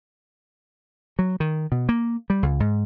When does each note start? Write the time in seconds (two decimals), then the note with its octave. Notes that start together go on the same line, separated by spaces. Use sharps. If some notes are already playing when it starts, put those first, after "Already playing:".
1.19 F#3
1.40 D#3
1.72 B2
1.89 A#3
2.30 G3
2.43 C#2
2.60 G#2